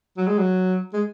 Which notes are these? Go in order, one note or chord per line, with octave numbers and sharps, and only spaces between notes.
F#3
G#3
F#3
G#3